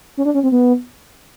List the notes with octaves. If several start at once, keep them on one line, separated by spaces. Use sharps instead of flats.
C#4
D4
C#4
C4
B3